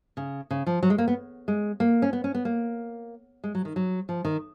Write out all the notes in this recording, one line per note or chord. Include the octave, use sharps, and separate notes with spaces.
C#3
C#3
F3
F#3
G#3
A#3
B3
G#3
A#3
C#4
B3
C#4
B3
A#3
G#3
F#3
D#3
F#3
F3
D#3